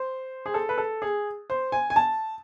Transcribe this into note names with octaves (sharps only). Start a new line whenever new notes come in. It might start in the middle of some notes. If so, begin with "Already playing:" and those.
Already playing: C5
G#4
A4
B4
A4
G#4
C5
G#5
G#5
A5